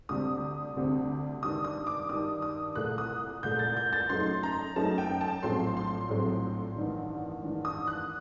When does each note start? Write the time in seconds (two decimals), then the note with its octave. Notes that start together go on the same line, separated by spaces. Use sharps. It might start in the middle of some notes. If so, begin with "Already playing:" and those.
0.09 D2 C3 G3 C4 D#6
0.77 D2 C3 G3 C4
1.43 G2 D#3 G3 D4 D#6
1.64 D#6
1.87 D6
2.09 G2 D#3 G3 D4 D#6
2.42 D#6
2.75 C2 A#2 A3 F#6
2.98 D#6
3.43 C2 A#2 A3 G6
3.59 A6
3.77 G6
3.93 A6
4.09 F#2 F#3 A3 D#4 C6
4.43 A#5
4.76 F#2 F#3 A3 D#4 A5
4.98 G5
5.21 A5
5.43 A#1 A2 F#3 A3 C4 C6
5.77 C6
6.09 A#1 A2 F#3 A3 C4
6.76 A1 G2 D#3
7.43 A1 G2 D#3
7.65 D#6
7.87 F#6